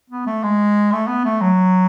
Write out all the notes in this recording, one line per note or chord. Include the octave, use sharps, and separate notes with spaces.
B3
A3
G#3
A3
B3
A3
F#3